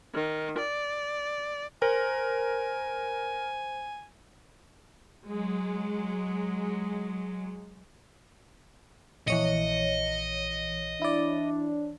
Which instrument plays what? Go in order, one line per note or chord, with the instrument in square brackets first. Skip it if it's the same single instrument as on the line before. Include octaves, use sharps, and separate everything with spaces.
[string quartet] D#3
D5
[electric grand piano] A#4 [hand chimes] C5 [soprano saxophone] G#5
[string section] F#3 G#3
[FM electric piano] A#1 [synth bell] E3 C#5 C#7 [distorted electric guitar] D#5
[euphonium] D4 [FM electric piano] E4 D5